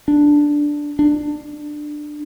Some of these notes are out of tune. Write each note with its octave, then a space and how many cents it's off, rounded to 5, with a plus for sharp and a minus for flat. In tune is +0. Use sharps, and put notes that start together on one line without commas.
D4 +0
D4 +20